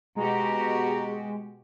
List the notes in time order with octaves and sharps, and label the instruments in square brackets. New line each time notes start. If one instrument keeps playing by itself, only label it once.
[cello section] B2 F#4 G4 [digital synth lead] G#3 [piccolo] A#5